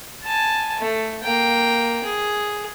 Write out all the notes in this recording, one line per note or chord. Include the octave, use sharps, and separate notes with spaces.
G#5 A5
A3
A#3 G5
G#4